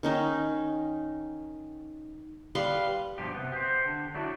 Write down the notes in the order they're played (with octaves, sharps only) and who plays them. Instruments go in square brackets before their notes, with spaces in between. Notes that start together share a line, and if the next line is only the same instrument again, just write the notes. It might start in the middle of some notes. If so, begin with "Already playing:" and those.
[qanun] D#3 C#4 D#4
G3 B4 F5 C6
[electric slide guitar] G2 B2 F3 G4
C3 B3
G4 C5
D3
F#3 A3 D4 E4 F#4